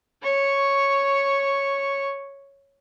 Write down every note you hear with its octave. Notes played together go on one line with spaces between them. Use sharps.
C#5 C#6